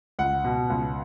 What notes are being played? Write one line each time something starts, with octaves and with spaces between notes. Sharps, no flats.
C#2 F#5
B2
C#2